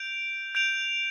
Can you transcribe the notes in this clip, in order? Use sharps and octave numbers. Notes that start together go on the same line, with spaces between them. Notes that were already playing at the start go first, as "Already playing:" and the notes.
Already playing: G6 D7 F7
G6 D7 F7